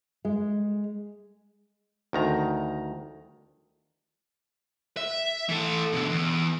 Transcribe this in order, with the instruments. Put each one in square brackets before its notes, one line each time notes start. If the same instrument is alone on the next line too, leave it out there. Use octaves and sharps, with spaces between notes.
[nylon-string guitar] G#3
[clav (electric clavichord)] D2 D#3 A#5
[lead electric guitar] E5
E3 A4
B2 D3
E2